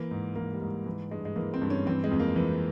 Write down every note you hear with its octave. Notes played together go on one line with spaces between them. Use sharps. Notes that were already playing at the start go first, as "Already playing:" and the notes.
Already playing: E3 A#3
G#2
E3 A#3
G3
G#2
E3
G2 G#3
G#3
E3 A#3
C4
G2
C#4
E3 C4
G#3
F2
A#3
E3